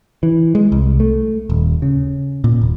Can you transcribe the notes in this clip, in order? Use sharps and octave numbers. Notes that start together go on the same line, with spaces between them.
E3
G#3
C2
A3
D#1
C#3
A#2
D#1